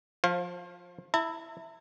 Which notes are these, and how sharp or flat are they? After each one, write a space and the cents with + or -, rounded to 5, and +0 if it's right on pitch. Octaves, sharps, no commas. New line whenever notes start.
F3 +20 C5 +40 F5 +0
E4 +0 A#5 -45